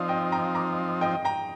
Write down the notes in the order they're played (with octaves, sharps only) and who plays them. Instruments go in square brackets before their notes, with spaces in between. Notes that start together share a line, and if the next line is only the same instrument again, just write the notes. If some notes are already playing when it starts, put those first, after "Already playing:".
Already playing: [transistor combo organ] F3 C4 D#4 [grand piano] D5 F5
[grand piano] D#5 G5
G5 A#5
A#5 D6
D#5 G5
G5 A#5